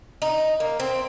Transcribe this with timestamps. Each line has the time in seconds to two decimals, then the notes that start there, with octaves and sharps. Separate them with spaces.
0.22 D#4
0.60 A#3
0.80 C4